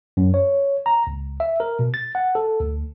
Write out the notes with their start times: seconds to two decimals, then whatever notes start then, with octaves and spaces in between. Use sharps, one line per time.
0.17 F#2
0.34 C#5
0.86 A#5
1.07 C#2
1.40 E5
1.60 A#4
1.79 B2
1.94 A6
2.15 F#5
2.35 A4
2.60 D2